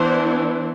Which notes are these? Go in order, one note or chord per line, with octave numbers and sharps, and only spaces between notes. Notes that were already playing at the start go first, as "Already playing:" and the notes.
Already playing: E3 B3 D4 C5